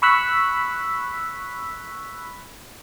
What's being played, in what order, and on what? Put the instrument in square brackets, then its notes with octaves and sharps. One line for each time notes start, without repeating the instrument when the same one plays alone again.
[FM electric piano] B5 C#6 E6 F#6 B6